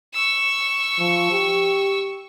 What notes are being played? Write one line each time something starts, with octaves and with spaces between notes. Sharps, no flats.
C#6 E6
F3
G4